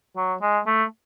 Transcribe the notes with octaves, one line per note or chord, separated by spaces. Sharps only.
F#3
G#3
A3